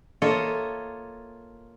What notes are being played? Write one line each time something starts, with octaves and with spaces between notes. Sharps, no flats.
A#3 F4 A4 C#5 D#5 E5